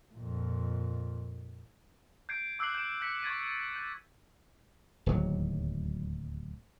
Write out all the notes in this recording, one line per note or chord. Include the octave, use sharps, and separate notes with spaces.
F2 A#2
G6 G#6 C7 D7
D6 E6 F#6 G6 C7 F#7
G6 D7 E7
G6 B6 C#7
C#6 G#6 A6 D#7
G6
D1 D#2 F#3